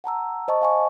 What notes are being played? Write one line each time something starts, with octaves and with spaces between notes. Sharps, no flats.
F#5 A5 A#5 E6
C5 D#5 A5 C#6
F5 G#5 C#6